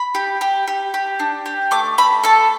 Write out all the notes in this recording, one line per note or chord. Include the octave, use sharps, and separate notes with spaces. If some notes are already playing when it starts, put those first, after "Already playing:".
Already playing: B5
G4
G4
G4
G4
D4
G4
A3 D6
A3 B5
A4 A5